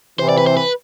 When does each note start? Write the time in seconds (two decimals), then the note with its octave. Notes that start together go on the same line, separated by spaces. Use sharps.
0.19 C3 E3 C5
0.29 D5
0.38 B4
0.47 C5
0.57 B4